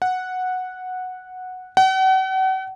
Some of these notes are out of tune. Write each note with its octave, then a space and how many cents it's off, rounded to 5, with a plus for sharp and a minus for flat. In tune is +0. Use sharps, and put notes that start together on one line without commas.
F#5 -5
F#5 +40